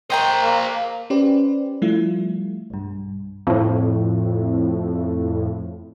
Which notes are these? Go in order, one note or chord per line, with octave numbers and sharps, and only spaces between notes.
A#4 C5 D#5 G5 A#5
A#3
C#4 G4 B4 C5 D5
F3 G3 A3 E4 F4
B1 G2
F2 A2